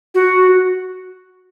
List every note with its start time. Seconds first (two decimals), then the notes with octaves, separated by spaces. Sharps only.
0.15 F#4